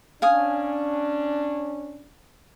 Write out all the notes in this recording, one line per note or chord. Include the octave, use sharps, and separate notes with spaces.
C#4 D4 F5 G#5 D#6